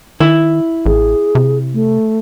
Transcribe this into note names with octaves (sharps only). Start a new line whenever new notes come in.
D#3 E4
A1 G#4
C3
A3